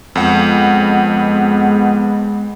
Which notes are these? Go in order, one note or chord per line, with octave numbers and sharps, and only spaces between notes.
F2 G#3 B3 F#5